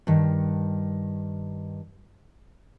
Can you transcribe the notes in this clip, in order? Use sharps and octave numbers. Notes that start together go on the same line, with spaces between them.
G2 D#3